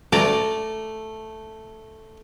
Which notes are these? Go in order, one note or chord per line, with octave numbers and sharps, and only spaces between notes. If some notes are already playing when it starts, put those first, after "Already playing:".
A3 D5 A#5